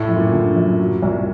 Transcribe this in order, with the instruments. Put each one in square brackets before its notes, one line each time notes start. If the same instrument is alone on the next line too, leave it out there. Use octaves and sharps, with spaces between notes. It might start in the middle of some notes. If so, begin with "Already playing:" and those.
Already playing: [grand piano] A2 [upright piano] A3
[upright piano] F#2
[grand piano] A#2
[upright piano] D3
F#2
F#3
C2